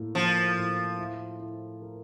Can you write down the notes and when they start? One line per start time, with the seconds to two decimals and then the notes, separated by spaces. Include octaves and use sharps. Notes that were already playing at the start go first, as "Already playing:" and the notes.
Already playing: A2 A#3
0.15 F3 A#3
0.57 A2
0.99 E4
1.40 E4
1.82 A#4